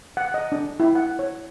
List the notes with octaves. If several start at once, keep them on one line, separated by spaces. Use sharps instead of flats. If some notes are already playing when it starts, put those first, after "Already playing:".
F#5
D#5
D4
E4
F#5
C#5